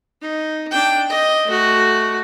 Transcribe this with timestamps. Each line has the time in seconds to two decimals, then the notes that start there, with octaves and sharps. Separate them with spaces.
0.22 D#4
0.71 D4 G5
1.10 D#5
1.46 A3 F#4